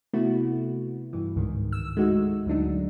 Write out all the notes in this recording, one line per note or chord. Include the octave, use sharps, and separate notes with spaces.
C3 A3 B3 E4 F#4
G2 E3
C#2 G#2 D#3
E6
G#3 A3 D#4 F#4
D2 F#3 D4 D#4